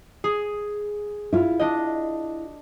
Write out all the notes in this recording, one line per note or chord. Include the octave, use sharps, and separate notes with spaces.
G#4
E4 F4
D4 D#5